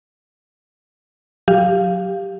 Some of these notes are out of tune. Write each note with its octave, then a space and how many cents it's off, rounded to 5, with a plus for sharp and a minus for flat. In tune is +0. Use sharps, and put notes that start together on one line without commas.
F#3 -20 G4 +0 F5 +0